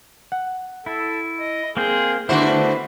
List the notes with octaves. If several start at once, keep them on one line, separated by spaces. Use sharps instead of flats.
F#5
E4 A4
D#5
A#3 C4 G#4 C5
D3 A3 B3 D4 E4 F#4 B4 C5